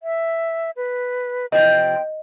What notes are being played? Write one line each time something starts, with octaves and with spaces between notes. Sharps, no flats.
E5
B4
C3 F3 C4 D#5 G5